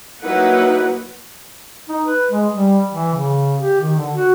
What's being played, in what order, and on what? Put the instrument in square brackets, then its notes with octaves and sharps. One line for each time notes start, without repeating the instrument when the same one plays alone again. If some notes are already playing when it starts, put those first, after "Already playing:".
[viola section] F#3 A#3 D#4 E4 B4 F#5
[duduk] D#4
B4
G#3
G3
E3
C#3
G4
D#3
D3
F#4